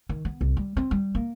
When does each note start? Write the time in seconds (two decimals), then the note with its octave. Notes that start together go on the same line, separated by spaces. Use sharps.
0.09 D#3
0.25 B3
0.41 C2
0.57 G3
0.77 C4
0.91 G3
1.15 A#3